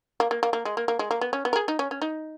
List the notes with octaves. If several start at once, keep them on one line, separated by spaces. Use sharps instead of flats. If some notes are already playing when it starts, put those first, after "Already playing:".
A#3
A#3
A#3
A#3
G#3
A#3
A#3
G#3
A#3
B3
C#4
B3
A#4
G#4
D#4
C#4
C#4
D#4